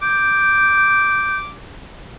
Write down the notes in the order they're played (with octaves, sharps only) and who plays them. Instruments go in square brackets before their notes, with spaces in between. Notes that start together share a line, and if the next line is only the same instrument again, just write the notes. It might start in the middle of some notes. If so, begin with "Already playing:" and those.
[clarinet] D6 [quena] G6